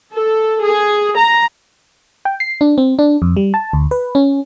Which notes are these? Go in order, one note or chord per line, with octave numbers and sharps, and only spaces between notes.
A4
G#4
A#5
G5
C7
D4
C4
D4
F2
G3
A5
D2
B4
C#4